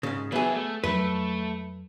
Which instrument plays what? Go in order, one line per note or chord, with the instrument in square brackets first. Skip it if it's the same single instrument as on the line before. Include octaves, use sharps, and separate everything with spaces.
[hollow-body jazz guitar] G#2 C#3
[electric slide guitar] F#3 B4 E5 [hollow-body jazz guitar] B3 G#4
[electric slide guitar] A3
[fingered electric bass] F2 F#3 [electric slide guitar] A3 [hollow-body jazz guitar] B4